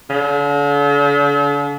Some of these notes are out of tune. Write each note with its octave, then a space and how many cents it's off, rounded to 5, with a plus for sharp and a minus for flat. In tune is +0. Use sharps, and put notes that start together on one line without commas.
D3 -45